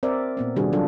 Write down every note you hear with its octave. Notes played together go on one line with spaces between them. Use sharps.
C4 A#4 D5 E5
A#2 B3 C4
C3 D#3 G3 D4 F#4 G#4
F#3 D4 F4 A4